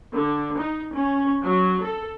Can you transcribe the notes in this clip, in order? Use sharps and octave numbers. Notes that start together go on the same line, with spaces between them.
D3
D#4
C#4
F#3
A4